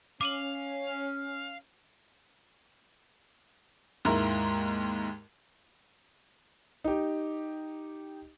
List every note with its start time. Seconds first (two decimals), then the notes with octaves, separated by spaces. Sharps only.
0.21 C#4 F5 D6 D#7 F#7
4.05 D#2 G#2 E4 A#4 A#5 C6
6.84 D#4 G4